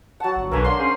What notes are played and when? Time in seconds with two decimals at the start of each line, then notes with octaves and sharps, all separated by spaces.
0.20 F#3 F#5 A5
0.36 G1
0.51 B1 G2 D3 E3 A#4 G#5
0.64 A#3 D4 C6
0.78 C#4 G#4 C5 C6